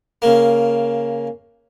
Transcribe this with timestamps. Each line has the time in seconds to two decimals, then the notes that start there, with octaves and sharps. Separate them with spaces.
0.22 C#3 A#3